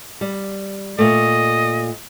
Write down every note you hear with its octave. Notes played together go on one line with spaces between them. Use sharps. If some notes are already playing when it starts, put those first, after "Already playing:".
G3
A#2 A3 D#5